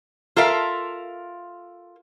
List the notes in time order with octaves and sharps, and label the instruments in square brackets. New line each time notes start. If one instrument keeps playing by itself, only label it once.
[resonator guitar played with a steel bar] F4 A4 A#4 E5 F5